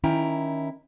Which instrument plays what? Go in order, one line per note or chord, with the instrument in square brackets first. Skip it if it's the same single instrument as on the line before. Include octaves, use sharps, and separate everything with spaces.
[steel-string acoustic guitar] D#3 C#4 E4 G5 A#5